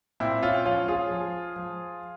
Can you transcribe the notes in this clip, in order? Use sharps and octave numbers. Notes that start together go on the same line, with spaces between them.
A#2 C4 E4
C#4 F4
F3 C#4 F4
F4 G#4
F3
F3